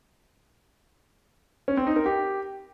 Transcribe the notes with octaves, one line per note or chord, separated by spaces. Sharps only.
C#4
C4
D#4
A#4
G4